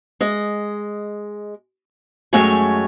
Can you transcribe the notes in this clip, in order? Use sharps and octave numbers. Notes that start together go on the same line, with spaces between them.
G#3 D#5
F#2 G#3 A3 C#5 G5 G#5